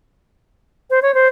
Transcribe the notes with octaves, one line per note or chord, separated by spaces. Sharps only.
C5
C#5
C5